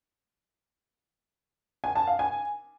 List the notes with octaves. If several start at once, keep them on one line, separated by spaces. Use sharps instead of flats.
G#5
A5
F5
G#5